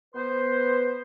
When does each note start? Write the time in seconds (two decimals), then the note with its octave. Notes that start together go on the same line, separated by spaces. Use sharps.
0.15 B3 B4 C5 C6